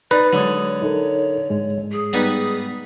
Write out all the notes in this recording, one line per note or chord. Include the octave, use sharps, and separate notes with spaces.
D#4 B4 D5
D3 F#3 G#3 C#5 D#6
D#4 A4 A#4
G#2 G#3
G#4
G3 B3 D#4